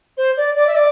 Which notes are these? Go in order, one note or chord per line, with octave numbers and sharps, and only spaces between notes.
C5
D5
D5
E5
D5